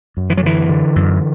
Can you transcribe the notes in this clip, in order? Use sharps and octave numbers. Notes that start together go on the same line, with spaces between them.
F#2
E3
F#3
D3 E3
D3
F#2